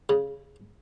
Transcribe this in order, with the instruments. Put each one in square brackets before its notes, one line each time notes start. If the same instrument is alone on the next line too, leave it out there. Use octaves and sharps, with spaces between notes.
[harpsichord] C#3